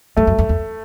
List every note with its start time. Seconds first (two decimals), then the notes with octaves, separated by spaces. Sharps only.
0.17 G2 A3
0.27 F#2
0.38 F2
0.49 E2